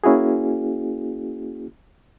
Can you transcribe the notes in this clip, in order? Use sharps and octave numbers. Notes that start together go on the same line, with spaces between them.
A#3 C#4 E4 F#4 G#4